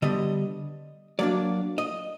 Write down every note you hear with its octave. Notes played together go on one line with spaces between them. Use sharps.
D3 G3 B3 D#5
F#3 A#3 D4 D5
D#5